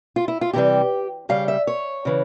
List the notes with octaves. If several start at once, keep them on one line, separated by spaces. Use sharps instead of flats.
F4
E4
F4
C3 E3 G3 G4
C#3 G3 F5
E5
C#5
C#3 E3